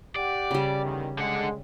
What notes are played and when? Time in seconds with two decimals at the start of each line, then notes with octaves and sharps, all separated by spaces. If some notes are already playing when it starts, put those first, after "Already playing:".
0.16 G4 D5 F#5
0.51 C#3 G3
0.80 E2 D3 D#3
1.19 D3 G#3 F#5